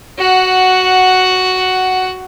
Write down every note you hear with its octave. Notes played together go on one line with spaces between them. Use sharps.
F#4 F#5